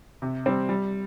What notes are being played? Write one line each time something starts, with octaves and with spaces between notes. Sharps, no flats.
C3
G3 C4
G3